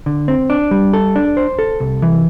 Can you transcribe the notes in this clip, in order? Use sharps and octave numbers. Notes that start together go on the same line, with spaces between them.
D3
C4
D4
G3
A4
D4
C5
A4
C2
E3